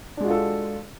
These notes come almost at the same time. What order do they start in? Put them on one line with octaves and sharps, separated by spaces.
D4 G#3 F#4 F4 A4